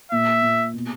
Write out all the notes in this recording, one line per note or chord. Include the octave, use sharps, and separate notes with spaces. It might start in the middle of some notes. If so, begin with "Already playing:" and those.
A#2 E5
A#2
B2